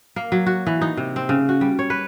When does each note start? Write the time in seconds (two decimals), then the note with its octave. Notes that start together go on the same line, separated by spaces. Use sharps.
0.16 A#3
0.32 F#3
0.46 F#4
0.67 E3
0.81 D#4
0.97 C3
1.16 C4
1.29 C#3
1.49 F#4
1.61 G3
1.79 C#5
1.90 B4